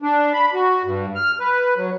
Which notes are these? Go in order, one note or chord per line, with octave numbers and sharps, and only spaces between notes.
D4
B5
F#4
G2
F6
B4
F#3